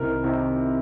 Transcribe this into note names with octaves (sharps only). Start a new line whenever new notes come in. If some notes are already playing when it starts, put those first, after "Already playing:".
Already playing: C2 C3 D#3 A#4
C3 D#3